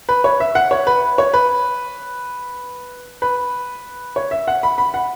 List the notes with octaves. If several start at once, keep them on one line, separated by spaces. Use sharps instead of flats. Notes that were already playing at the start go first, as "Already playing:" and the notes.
B4
C#5
E5
F#5
C#5
B4
C#5
B4
B4
C#5
E5
F#5
B5
B5
F#5